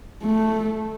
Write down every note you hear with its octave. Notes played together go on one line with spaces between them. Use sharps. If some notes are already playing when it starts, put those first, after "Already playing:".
A3